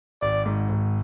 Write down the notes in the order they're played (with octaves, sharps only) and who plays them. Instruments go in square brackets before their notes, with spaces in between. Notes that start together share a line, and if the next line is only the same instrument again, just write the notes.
[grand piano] G#1 [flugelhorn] D5
[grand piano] G#2
G#1